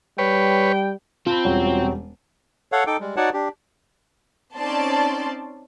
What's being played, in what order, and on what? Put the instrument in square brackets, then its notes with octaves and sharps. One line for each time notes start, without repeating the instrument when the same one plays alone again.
[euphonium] G3 [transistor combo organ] B4 C#5 [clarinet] G5
[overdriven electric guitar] C4 [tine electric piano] F4 [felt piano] A5 B5
[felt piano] E1 G3 C#4 [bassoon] F#3
[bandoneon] A4 C#5 F5 F#5
D#4 A4 G5 D6
G3 G#3
D#4 F#4 C#5 D5 F#5 A5
D4 G4
[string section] C4 C#4 D#4 D5 A5 C6